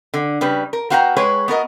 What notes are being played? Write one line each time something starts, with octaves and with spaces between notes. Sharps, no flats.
D3
C#3 G3 B4
A#4
B3 F#4 F5 G5 G#5 A#5
G#3 G#4 B4 C#5
B3 F#4 A#4 D#5